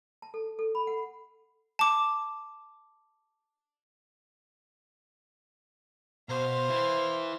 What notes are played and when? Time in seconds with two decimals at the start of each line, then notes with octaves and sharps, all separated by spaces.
0.22 A5
0.34 A4
0.59 A4
0.75 B5
0.87 F#5
1.79 A5 D6
6.29 B2 C5 F5
6.70 E4 B4